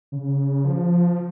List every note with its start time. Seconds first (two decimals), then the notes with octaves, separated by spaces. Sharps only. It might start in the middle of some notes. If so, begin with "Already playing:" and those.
0.12 C#3
0.65 F3